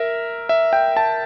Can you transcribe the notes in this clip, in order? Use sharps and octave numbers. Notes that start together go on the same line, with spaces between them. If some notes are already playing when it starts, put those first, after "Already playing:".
Already playing: A#4 E5
E5
G5
A5